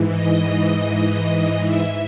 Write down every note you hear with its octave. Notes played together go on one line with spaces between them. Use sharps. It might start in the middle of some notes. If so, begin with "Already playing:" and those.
Already playing: G#2 E3
D#5
E5